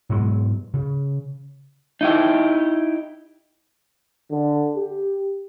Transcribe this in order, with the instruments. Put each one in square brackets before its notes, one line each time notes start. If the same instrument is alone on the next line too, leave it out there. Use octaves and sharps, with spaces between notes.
[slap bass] G#2 B2 F#3 G#3
C#3
[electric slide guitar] D#4 E4 G4
[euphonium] D3
G4